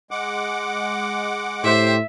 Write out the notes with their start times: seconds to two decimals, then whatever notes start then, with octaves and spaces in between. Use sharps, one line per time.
0.11 G#3 F#5 D6
1.64 A2 G4 C5 E5